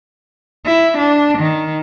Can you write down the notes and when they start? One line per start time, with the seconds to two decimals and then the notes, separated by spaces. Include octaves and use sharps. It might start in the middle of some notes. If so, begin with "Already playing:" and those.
0.66 E4
0.98 D4
1.39 D#3